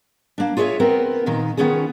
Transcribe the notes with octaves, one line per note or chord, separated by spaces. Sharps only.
A#3 D4
F4 G#4 C#5 D#5 E5
B3 C4 A#4
A#2 D#3 D#4
D#3 E3 B3 C#4 F4 G#4